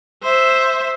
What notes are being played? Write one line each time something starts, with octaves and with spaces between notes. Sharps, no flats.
C5 E5